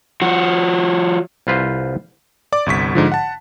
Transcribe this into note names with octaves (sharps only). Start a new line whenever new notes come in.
F3 F#4
C2 F4 B4 C5
D5 D6
G1 C2 C#6 B6
G#2 D3 F3
F#5 A5